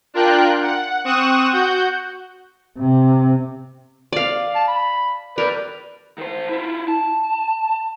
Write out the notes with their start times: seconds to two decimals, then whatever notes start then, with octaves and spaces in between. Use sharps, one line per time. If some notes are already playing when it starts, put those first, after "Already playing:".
0.14 D4 F4 A#4 G5 F#6
0.62 F#5
1.04 C4 C#6 D#6 F#6 E7
1.53 F#4 F#5 G6
2.79 C3
4.12 D5 F5
4.55 A5
4.68 B5
5.38 A#4 B4 D5
6.18 D#3 C5
6.49 E4 F4
6.88 A5